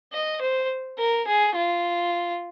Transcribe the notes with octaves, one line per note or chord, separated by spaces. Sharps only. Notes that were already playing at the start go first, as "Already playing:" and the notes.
D#5
C5
A#4
G#4
F4